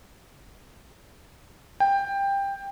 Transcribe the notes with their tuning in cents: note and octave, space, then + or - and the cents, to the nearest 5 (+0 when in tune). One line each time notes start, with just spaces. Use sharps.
G5 +15